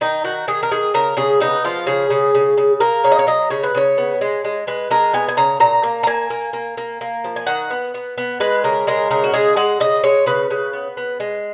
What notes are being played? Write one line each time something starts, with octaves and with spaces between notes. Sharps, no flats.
D#3 D#4
D#3 F#4
D#3 G#4
A#4
D#3 G#4
C#3 A#4
C#3 G#4
B3 D#4
F3 F4
C#3 G#4
C#3
C#3
C#3
A#3 A#4
C#3 C#5
D#5
C#5
F#3 D#5
C#3 C#5
B4
C#3 C#5
B3
G#3
G#3
G#3 B4
G#3 A#4
B3 G#5
G#5
C#3 A#5
A#2 A#5
A#3
A#5
A#3 G#5
A#3
A#3
A#3
A#3
F3
G#5
D#3 F#5
B3
B3
B3
G#3 B4
C#3 A#4
G#3 A#4
C#3 A#4
F#4
G#3 G#4
G#3 F#5
C#3 D#5
G#3 C#5
C#3 B4
C#3
B3
B3
G#3